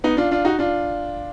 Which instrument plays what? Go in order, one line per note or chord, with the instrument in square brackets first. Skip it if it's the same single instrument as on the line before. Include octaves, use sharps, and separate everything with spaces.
[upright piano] B3 D#4
D4 F4
D4 F4
D#4 F#4
D4 F4